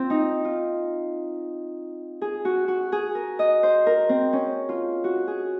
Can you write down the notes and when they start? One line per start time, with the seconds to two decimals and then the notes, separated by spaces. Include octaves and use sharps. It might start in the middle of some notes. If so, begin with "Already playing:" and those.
Already playing: C4 F4
0.10 D#4
0.45 F4
2.22 G#4
2.45 F#4
2.68 F#4
2.92 G#4
3.15 A#4
3.39 D#5
3.63 C5
3.86 A#4
4.09 C4
4.33 C#4
4.69 F4
5.04 F#4
5.27 G#4